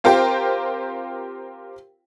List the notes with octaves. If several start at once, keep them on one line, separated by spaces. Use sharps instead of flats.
C4 F4 G4 A#4 C5 G5